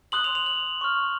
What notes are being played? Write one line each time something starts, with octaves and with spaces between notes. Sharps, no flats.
C6 D#6 F#6 F#7
F7
F7
F#7
C#6 F6